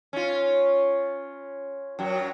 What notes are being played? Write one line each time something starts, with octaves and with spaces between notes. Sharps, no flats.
C#4 F4
F#2 F#3